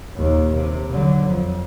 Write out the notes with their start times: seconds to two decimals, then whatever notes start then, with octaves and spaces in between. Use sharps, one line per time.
0.14 D#2 A#2
0.54 C3
0.91 D3 F#3
1.25 F2